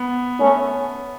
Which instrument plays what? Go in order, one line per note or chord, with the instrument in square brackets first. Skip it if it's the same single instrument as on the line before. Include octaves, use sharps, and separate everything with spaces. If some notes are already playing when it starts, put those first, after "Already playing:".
Already playing: [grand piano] B3
[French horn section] A3 C#4